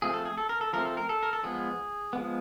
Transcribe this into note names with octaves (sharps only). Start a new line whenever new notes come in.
F3 A3 C4 G#4
A4
G#4
A4
A#4
A4
F3 A3 C4 A#4
A4
A#4
A4
A#4
A4
F3 G#3 B3 G#4
F3 G#3 B3